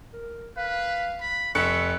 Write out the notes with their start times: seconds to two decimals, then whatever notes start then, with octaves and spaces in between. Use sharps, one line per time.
0.13 A#4
0.57 B4 F5
1.21 B5
1.55 F1 E5 C#6 F#6 C#7